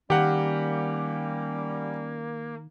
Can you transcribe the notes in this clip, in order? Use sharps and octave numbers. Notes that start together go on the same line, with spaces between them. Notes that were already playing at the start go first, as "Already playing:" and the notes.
D#3 G3 A#3 C#4 G4 F#5